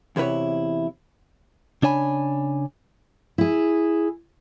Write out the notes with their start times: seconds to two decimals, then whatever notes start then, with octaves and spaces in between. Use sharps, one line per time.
0.16 E2 C3 E4 B4 C#5
1.83 C#3 D4 C#5 G#5 B5
3.38 E4 G#4